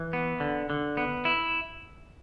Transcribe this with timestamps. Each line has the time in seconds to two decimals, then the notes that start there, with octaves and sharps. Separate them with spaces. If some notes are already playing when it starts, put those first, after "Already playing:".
Already playing: E3
0.13 B3
0.40 D3
0.70 D3
0.97 B3
1.25 E4